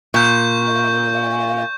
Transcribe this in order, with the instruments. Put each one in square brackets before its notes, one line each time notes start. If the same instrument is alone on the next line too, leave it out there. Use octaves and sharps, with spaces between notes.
[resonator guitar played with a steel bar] A#2 [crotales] C#6 G6